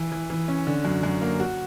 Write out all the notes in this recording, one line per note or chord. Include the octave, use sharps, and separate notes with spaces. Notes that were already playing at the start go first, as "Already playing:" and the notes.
Already playing: E3
E3
E3
C#4
D3
F#2
F#2
A#3
F#4